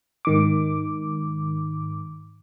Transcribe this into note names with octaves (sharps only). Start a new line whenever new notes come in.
G#2 D#3 D6